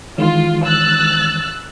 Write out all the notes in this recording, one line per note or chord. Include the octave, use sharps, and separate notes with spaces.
D#3 E3 G#3 F4
E6 F#6 A6